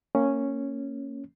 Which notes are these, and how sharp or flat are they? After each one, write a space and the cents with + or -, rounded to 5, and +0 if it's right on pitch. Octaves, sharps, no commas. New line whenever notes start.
A#3 -15 C#4 -5